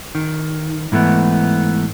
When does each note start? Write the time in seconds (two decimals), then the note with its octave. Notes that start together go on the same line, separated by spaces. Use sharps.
0.15 D#3
0.92 G#2 E3 A3 B3